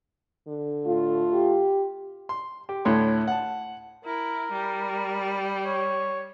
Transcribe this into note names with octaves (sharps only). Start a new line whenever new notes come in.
D3
A2 A3 F4
G4
C6
G4
D2 A2 C#5 C6
F#5 A5
E4 A#4
G3
C#5